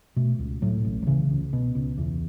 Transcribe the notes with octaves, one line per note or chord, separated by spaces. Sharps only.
B2 A3
C#2
A2 F#3
A1
F#3
C#3 E3
C#2
B2
C#2
E2